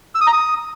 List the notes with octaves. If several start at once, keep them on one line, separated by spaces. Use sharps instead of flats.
E6
D#6
A#5
D#6